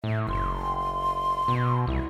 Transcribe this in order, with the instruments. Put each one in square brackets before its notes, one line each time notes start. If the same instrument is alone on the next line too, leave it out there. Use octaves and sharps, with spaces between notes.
[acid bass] A2 [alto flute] E5
[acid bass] F#1 [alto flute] C6
[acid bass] B2
[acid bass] C2 [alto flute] E4